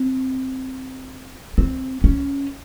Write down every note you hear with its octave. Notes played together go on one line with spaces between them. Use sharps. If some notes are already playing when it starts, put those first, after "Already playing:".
Already playing: C4
C4
C#4